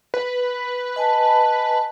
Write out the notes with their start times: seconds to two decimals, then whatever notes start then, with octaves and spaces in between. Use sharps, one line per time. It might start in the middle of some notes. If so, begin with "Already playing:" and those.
0.14 B4
0.96 D#5 G#5 A5